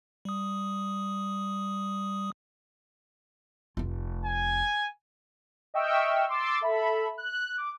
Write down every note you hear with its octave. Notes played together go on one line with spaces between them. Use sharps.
G3 D#6
F1 F4
G#5
D#5 E5 G5 C#6 E6 F6
C6 D6 E6 A6
A4 E5 B5
F#6
D6